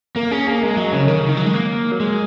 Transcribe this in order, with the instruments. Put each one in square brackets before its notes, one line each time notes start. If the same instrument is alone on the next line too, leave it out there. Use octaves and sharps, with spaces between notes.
[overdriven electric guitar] A#3 [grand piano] A#4
[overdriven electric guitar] C#4 [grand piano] G#4
[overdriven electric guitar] A#3 [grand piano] G#4
[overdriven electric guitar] G#3 [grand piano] A#4
[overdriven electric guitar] F#3 [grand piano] D#5
[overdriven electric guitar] C#3 [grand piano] C#5
[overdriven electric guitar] D#3 [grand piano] A#4
[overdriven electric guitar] C#3
D#3
F#3
G#3
A#3
F#3
G#3